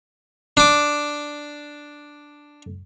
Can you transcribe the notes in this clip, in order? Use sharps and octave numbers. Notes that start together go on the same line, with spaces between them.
D4 D6